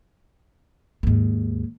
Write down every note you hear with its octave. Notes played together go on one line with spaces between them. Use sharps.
D#2 G#2